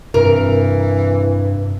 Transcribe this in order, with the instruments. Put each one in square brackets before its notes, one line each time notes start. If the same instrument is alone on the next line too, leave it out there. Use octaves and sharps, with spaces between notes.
[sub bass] G2 [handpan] C3 [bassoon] E3 [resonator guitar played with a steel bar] A#4